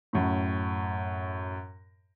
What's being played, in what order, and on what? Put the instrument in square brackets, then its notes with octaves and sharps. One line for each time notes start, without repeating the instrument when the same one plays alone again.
[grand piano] F#2 A2